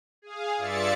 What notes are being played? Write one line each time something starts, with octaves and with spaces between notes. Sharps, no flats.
G#4 F5
G2 F4 D5 E5 A6 C#7